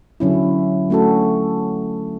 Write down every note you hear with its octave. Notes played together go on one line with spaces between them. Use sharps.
D3 F#3 C#4 E4
A3 C#4 F#4 A4